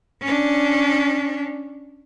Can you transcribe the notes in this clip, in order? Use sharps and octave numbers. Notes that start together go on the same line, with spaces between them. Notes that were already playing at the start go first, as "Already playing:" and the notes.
C#4 D4